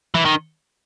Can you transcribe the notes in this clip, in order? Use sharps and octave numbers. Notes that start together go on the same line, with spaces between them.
E3
D#3